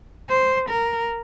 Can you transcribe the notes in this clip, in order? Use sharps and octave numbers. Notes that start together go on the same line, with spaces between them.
C5
A#4